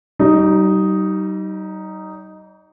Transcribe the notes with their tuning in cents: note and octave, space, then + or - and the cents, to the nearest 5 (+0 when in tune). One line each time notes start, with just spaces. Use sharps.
G3 -40 D#4 +0